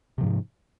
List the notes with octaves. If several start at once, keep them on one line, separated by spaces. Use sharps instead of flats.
G#2 C3 F3